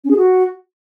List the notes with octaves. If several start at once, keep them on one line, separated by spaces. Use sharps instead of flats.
C#4
G#4
F#4